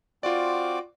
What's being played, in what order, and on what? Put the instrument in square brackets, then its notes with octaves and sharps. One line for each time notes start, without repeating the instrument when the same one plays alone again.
[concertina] C4 F#4 D6 [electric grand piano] F4 D5